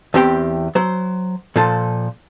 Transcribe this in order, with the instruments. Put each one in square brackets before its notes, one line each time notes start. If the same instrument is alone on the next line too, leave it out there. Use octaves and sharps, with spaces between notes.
[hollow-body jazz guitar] E2 C4 G4 G5
F#3 C5
A#2 F3 A4